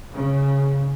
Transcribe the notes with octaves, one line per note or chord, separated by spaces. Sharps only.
C#3